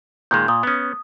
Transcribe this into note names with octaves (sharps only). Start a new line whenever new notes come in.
A#2 D#3 G#3 G6
A#2 D#6
B3 C#4